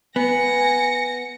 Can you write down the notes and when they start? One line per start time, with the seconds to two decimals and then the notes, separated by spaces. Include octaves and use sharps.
0.16 B3 G#5 A#6 C#7